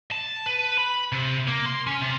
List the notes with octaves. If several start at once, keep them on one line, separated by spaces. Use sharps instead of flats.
A5
B4
B5
C3
A#3
C6
C#4
C3